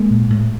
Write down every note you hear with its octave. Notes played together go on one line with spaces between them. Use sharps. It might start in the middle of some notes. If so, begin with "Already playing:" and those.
Already playing: G#3 A#3
A#2
A2